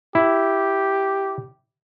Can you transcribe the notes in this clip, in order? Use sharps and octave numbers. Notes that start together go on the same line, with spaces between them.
E4 G4